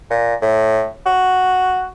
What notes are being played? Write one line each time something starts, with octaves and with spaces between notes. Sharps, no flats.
A#2
A2
F#4